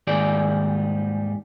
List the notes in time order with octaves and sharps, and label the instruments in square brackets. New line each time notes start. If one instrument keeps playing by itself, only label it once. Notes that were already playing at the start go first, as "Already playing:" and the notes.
[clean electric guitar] D#2 G#2 D#3 G3 G#4 D5